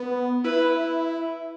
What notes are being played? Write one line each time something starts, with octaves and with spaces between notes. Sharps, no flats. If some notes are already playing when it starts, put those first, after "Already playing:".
Already playing: B3
E4 B4